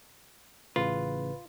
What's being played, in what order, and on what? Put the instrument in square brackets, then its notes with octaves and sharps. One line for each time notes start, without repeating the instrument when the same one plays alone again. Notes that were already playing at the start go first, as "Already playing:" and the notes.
[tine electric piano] A1 A2 C#3 [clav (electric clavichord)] F4 [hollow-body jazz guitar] B4